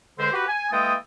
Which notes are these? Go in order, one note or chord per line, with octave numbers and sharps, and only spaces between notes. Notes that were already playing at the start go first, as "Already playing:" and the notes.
C#2 D3 G#3 C5
F#4 G4 B4
G#5
E3 G#3 A#3 A4 G5 D#6